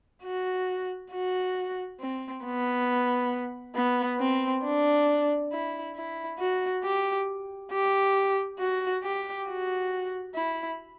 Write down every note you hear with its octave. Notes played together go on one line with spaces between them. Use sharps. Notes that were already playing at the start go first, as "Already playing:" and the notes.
F#4
F#4
C4
B3
B3
C4
D4
E4
E4
F#4
G4
G4
F#4
G4
F#4
E4